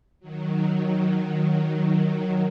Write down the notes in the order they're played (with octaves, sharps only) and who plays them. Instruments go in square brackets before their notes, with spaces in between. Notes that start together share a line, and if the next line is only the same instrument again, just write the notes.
[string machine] D#3 F#3